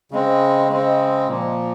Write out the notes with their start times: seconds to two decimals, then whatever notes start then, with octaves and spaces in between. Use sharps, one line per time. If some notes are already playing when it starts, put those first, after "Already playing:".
0.11 C#3 G#3 C4
0.70 C#3 G#3 C4
1.28 A#2 F3 A#3